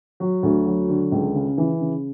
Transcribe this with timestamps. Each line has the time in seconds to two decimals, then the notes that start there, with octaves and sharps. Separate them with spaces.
0.20 F#3
0.43 D2
0.66 F#3
0.89 D3
1.12 C#2
1.35 C#3
1.58 E3
1.80 C#3